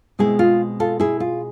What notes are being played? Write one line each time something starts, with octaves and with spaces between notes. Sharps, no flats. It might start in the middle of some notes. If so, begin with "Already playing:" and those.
B2 G#3 C4 E4 G#4
F4
F4 A4
E4 G#4
F4